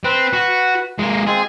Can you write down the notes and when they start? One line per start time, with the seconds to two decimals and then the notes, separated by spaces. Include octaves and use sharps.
0.04 C4 B4
0.33 F#4
0.99 G#3 A#3
1.27 G#3 C4 F4 G#4